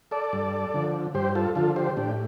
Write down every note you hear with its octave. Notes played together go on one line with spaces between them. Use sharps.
A4 D5
G2
D3 F3
G2 G4 C5
F4 A4
D3 F3 F4 A4
G4 C5
A2 D4 G4